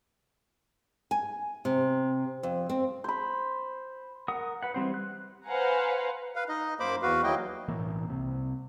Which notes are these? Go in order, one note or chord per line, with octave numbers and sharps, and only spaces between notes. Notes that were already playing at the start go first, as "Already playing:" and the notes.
G#5
C3
F2
C4
C5 B5
A#4 F#5 D#6
B4 F#5
E3 G3 C4 C5
F#6
B4 C5 F5 F#5 G#5 A#5
B4 F5
D#4 D#5
F#2 A#3 C5 B5 D6
E2 F#4 B4 F5
D#2 F#3 A#3 E4 D#5 G5
B1 A2 E3 A#3
C2 C3